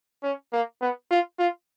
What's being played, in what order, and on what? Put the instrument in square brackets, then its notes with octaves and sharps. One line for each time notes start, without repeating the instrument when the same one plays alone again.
[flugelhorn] C#4
A#3
B3
F4
F4